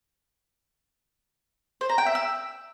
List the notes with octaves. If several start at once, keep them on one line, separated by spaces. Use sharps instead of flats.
C5
A#5
G5
E5
E6